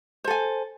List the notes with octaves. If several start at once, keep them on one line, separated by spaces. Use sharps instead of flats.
A4 C5 G#5